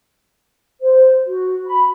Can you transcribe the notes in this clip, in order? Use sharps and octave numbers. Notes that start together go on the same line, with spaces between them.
C5
F#4
B5